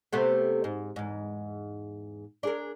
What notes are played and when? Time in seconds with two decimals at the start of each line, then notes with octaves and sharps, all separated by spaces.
0.13 C3 A3 B3
0.64 G#2
0.96 E2 G#2
2.43 D4 G#4 A#4